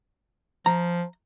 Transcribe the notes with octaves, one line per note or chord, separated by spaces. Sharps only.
F3 A#5